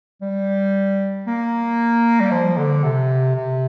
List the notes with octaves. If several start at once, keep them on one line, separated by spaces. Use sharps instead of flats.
G3
A#3
G3
F3
D3
C3
C3